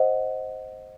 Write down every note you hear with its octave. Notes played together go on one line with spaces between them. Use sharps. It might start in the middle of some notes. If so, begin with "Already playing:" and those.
Already playing: C5 D#5 F#5